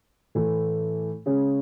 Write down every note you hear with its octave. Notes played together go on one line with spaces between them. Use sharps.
A2 E3 A3
C#3 G#3 C#4